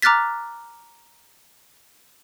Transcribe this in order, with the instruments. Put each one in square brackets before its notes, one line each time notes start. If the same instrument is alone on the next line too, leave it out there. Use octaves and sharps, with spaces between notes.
[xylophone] A#5 D6 F6 F#6 A6 B6